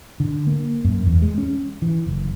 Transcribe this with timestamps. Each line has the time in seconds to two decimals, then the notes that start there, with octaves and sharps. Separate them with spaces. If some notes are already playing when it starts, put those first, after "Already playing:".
0.20 D3
0.47 A#3
0.84 F#2
1.07 E2
1.22 G#3
1.38 C#4
1.82 E3
2.06 F#1